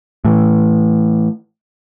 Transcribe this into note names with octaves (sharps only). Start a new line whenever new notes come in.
A2 E3